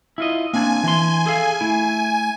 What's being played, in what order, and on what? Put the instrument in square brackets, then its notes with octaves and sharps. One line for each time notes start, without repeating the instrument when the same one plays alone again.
[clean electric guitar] E4 F4 D#5
[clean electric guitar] A#3 C4 D4 [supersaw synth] G#5
[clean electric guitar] E3 C6 [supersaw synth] G#5
[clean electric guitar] G#4 A4 F5
A3 E4